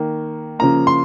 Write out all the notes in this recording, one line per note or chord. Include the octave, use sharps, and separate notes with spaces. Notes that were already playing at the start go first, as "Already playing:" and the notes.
Already playing: D#3 A#3
C#3 F3 A#3 A#5
C6